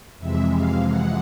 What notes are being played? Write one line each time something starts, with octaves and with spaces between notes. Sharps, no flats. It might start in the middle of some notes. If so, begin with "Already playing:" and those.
F2 C3 E3 G#3 E5
F5
F#5